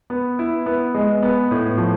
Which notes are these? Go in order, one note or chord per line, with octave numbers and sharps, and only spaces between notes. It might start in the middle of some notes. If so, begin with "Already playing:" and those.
B3
E4
B3
G#3
B3
A2
F3